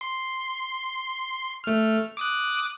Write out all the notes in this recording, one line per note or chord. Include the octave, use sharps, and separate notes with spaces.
C6
A3 F6
D6 D#6 F#6